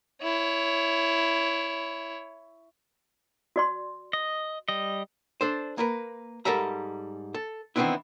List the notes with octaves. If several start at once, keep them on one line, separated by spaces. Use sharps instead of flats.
E4 C#5
F#4 D5 C6
D#5
G3 D#5
D4 A4 C5
A#3 A#4 B4
G#2 G3 A4 A#4 E5 A#5
A4
D#3 E3 B3 C4 D4 E4